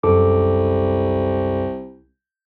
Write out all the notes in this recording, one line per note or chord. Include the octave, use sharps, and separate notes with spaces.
C2 F#2 A4 D6